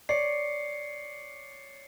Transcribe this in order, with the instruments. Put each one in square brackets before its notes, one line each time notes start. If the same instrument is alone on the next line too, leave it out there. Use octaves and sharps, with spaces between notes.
[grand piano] C#5 D5 [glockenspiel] C7 C#7